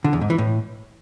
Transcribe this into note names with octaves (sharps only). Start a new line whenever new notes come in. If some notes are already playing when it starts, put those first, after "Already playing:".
D3
E2
G#2
E3
A2